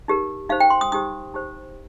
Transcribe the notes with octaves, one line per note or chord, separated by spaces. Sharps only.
D#4 G4 A#4
D#4 G4 C5 F5
G5
C6
D#6
D#4 G4 C5 D#6
D#4 G4 C5